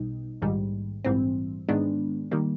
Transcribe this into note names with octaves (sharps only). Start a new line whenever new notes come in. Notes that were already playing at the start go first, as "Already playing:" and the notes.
Already playing: B1 B2 G3 D#4
A#1 G#2 D#3 G3
A#1 G#2 E3 G3 C4
G#2 D#3 G#3 B3 D4
D#3 G3 A#3